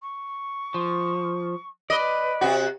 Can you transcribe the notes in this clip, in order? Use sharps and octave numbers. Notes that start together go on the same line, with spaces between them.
C#6
F3
B4 D5 D#5
C3 F#4